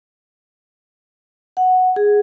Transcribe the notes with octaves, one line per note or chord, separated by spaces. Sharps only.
F#5
G#4